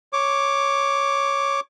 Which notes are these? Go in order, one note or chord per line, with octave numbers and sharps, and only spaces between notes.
C#5 D6